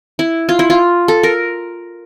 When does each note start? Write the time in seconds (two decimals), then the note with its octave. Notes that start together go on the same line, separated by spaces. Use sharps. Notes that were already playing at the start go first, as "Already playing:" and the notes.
0.19 E4
0.49 F4
0.59 E4
0.70 F4
1.08 A4
1.23 A#4